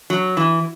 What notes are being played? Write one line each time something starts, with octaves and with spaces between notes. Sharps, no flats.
F#3
E3